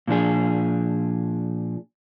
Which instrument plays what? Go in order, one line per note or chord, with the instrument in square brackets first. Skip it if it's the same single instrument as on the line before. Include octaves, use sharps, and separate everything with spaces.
[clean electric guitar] A#2 F3 D4 G#4